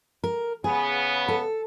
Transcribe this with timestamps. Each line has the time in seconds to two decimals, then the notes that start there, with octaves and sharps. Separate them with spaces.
0.24 A#4
0.64 C#3 B3 G#4
1.28 A4